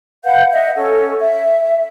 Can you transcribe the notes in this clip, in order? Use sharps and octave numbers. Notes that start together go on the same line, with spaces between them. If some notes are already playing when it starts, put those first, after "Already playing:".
B4 F5 F#5 G6
D#5 E5 F#5
C#4 A4
E5